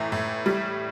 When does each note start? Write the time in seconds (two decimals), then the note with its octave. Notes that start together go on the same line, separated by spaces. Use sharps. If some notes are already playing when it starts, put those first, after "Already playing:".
Already playing: A2 E3 A#5
0.12 A2
0.46 G3